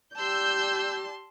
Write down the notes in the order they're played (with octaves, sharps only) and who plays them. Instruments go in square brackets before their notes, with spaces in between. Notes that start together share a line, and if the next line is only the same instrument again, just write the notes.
[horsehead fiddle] G4 D5 [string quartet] A5 C6 [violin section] E6 G6